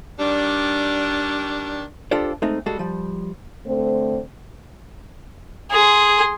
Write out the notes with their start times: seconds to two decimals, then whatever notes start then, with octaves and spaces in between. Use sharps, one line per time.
0.19 D#3 G3 D4
2.11 D4 F4 G4 A4 C5 D5
2.42 G#3 A3 C4 D#4
2.66 G3 G#3 F#4 A4
2.79 F3 G3
3.67 D3 A3 C4 C5
5.71 G#4 C6